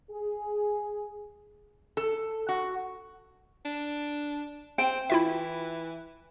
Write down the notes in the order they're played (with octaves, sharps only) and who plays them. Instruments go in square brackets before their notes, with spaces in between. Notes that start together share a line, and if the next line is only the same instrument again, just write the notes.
[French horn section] G#4
[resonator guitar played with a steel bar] A4
F#4
[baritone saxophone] D4
[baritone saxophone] C4 [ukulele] G5
[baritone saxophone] E3 [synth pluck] E4 F4 E5